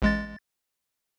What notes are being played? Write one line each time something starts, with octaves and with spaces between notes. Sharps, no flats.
A1 G#3 A6